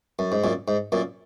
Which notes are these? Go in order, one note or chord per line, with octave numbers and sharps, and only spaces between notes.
F#2
G#2
F#2 A#2
G#2
F#2 A#2